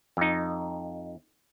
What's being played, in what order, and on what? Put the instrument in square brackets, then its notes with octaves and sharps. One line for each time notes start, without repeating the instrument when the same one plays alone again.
[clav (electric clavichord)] F2 D#4